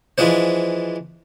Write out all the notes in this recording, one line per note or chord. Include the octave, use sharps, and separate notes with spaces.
E3 F3 G#3 D4 C5